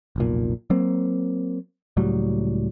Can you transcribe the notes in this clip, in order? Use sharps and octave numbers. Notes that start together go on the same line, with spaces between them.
F1 B1 A#2
F#3 A#3 C4
C#2 A2 F#3 G3